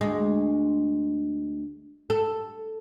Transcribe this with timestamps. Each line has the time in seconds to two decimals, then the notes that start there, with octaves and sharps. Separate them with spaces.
0.01 D2 G#3
2.10 A4